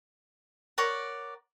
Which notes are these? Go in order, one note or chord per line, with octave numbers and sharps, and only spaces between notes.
A#4 C#5 D5 F#5